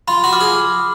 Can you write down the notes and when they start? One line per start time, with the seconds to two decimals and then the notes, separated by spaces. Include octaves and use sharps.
0.08 F4 B5
0.24 F#4
0.33 D6 F6
0.41 G#4